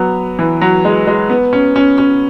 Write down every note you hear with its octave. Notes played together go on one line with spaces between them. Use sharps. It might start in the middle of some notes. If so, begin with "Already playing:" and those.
Already playing: F#3 B3
E3
F#3
G#3
G#3
B3
C#4
C#4
C#4